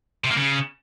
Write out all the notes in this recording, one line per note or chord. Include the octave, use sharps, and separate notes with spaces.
C3
A#3
C#3